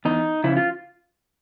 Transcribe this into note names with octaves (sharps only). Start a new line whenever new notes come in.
E2 D#4
C#3 F3 E4
F4